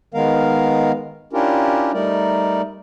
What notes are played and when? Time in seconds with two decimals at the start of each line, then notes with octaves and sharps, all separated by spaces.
0.14 D#3 G#3 B3 A#4 F5
1.33 C#4 D4 E4 F4 G4 A#4
1.93 G3 A3 D#4 A#4 D5